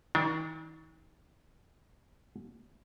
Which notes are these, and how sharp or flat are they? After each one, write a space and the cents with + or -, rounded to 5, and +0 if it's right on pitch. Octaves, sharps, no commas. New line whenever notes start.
D#3 +45 D4 +0